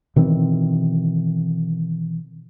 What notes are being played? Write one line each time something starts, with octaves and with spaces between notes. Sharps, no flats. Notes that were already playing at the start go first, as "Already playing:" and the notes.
B2 D#3 E3 C4